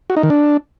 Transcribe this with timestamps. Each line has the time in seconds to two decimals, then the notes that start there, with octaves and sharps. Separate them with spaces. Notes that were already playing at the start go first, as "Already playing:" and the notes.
0.10 F#4
0.16 D#4
0.23 D#3
0.30 D4